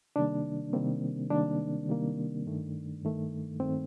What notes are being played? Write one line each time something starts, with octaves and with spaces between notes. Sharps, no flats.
C3 D#3 G3 A#3 D4
C3 D#3 G3 A#3 C4
C3 D#3 G3 A#3 D4
C3 D#3 G3 A#3
G2 D#3 A3
G2 D#3 A3
G2 D#3 A3 C4